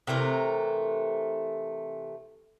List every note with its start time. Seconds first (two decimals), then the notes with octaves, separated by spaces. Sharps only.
0.07 C3 E3 A3 A#4